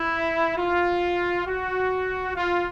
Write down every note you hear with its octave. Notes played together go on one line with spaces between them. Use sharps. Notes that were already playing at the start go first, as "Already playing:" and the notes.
Already playing: E4
F4
F#4
F4